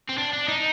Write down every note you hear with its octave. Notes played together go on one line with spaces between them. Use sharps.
C4
D4
D4
D#4